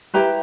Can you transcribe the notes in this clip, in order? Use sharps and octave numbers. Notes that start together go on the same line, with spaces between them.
E4 G4 B4 A#5